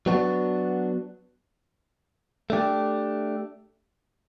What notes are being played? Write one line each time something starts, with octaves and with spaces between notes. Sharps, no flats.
F#3 B3 D4 F#4
A3 D4 G4